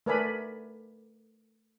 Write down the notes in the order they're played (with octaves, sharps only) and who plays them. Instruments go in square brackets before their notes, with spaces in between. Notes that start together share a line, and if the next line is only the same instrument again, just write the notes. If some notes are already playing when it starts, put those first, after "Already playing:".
[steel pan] A3 A#4 B4 D5 G#5 B5